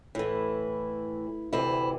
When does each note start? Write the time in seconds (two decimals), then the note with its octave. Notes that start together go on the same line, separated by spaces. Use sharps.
0.15 A2 E3 E4
1.53 D2 C3 E3 E4